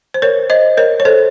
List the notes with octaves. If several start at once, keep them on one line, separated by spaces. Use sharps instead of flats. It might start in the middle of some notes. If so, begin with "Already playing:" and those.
C5
A#4 C#5
C5 D#5
A#4 C#5
C#5
A4 C5